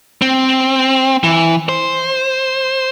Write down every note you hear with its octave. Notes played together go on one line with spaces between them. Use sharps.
C4
E3
C5